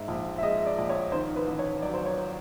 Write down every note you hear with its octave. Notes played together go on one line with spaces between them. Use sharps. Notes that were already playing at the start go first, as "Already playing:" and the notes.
Already playing: G#2 E5
A#1
E5
G#3 D#5
D5
A#1
C#5
D#3 C5
B4
A1
C#5
F#3 D5
C5
C#5